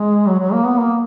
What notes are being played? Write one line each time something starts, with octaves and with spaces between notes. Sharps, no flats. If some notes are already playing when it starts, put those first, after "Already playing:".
Already playing: G#3
F#3
F#3
A#3
B3
A#3